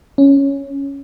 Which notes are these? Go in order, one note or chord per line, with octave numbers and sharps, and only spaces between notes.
C#4